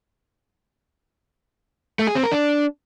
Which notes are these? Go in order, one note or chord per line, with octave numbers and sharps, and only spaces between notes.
A3
G#4
C4
A#4
D4